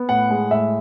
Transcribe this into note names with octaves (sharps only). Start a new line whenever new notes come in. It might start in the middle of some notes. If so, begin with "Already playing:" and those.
Already playing: B3
A2 F#5
G#3
A2 E5